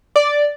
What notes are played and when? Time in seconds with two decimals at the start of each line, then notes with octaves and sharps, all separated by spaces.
0.16 D5